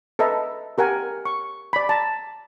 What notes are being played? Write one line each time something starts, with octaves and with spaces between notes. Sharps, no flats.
A4 B4 D#5 E5 A#5
G4 A#4 F#5 G#5
C#6
D5 B5
A5 A#5